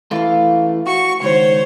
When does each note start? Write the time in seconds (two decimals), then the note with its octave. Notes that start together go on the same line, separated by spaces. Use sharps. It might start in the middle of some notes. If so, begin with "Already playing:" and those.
0.11 E3 A3 F4 F5
0.87 F#4 C#6
1.22 C#2 D#3 C5 C#5